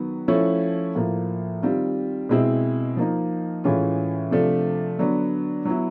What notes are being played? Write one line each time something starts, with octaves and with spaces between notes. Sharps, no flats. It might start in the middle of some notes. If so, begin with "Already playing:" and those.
Already playing: D#3 F#3 B3
F3 A3 C#4 E4
A2 F3 A#3
D#3 G3 C4 F4
B2 G#3 C4 E4
F3 A#3 D#4
A2 E3 G#3 C#4 F4
C3 F3 A3 D4
D3 F#3 B3 D4
F#3 B3 E4